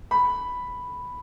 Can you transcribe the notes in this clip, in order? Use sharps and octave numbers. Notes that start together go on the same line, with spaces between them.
B5